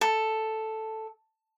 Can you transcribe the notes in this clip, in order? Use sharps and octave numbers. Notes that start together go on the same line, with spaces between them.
A4